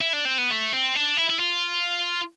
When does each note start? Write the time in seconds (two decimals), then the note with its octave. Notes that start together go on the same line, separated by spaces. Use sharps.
0.01 E4
0.13 D4
0.25 C4
0.38 B3
0.50 A3
0.73 C4
0.95 D4
1.17 E4
1.30 E4
1.39 F4